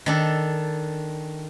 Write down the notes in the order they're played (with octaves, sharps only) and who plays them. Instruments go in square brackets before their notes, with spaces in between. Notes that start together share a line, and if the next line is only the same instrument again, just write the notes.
[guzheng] D#3 D4 A4